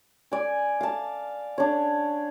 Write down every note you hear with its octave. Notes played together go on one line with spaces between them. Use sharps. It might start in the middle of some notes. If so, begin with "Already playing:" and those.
D5 G#5
F5 A5
D4 C#5